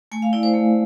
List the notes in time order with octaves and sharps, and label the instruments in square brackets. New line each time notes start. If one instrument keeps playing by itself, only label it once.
[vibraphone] A3 G#5
F5
E4 D5
C5
A3